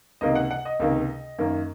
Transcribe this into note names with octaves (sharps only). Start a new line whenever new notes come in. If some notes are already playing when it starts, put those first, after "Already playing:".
C#2 C3 D#3 A#3 D#5
F#5
F#5
D#5
C#2 C3 D#3 A#3
F#2 D#3 A#3